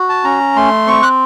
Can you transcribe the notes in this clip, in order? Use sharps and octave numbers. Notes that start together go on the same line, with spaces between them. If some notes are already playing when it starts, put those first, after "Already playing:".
Already playing: F#4
A5
C#4 A#5
A3 C6
C4 C#6
F#6